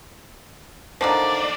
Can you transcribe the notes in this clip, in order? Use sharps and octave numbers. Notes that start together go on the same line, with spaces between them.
E2 D3 D#3 F3 D5